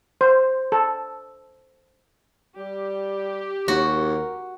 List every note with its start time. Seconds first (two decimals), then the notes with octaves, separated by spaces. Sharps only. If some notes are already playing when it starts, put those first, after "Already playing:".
0.21 C5
0.72 A4
2.58 G3 G4
3.68 D#2 F#4 A#4